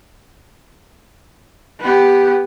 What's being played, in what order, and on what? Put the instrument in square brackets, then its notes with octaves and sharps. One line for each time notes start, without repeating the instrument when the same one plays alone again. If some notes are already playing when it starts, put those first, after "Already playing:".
[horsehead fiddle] B3 G4